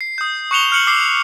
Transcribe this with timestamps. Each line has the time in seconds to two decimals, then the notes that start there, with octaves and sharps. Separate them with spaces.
0.01 C7
0.18 D#6 G6
0.51 C#6 F#6 C#7 E7 F7 G7
0.71 C#6 F6 F#6 C#7 F#7
0.87 D6 E6 C7